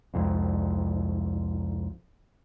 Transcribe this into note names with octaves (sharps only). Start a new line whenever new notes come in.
C2 F2 G#2